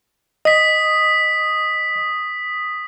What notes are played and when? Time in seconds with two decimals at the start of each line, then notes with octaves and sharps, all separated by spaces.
0.45 D#5 D#6 B6